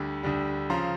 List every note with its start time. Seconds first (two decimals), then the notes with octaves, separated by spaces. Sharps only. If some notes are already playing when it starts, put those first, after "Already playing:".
Already playing: D2 D3 G3
0.23 D2 D3 G3
0.70 C#3 F3 A#5 C6